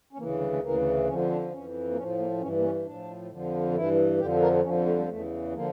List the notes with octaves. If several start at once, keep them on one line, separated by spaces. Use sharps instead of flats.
C#4
D2 C#3 E3 A#3
G3
A3
D2 C#3 E3 A#3
F2 D3 F3 C#4
D4
F2 E3 C#4
A#3
A2 F3 C#4
A#3
G2 E3 C#4
A#3
C#4
A2 F3 D4
F2 D3 F3
G2 E3 E4
F2 D3 F3 G4
A#4
F2 D3 F3 C#4
A3
G3
E2 C#3 E3 A3
D3 F3 A#3